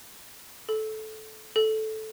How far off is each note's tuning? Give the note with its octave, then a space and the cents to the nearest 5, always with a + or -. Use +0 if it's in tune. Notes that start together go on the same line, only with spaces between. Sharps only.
A4 -15
A4 -10